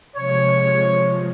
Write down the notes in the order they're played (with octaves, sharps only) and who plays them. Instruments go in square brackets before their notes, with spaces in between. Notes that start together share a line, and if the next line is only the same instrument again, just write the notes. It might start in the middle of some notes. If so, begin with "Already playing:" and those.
[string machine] C3 F3 G#3 [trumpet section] C#5